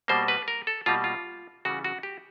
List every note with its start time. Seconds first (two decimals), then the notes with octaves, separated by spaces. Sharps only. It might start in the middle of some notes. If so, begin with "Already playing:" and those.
0.08 B2 G3 A#3 C5
0.28 B4
0.48 A#4
0.67 A4
0.86 B2 G3 A#3 F4
1.04 F4
1.65 C#3 E3 G3 F#4
1.84 F#4
2.03 G4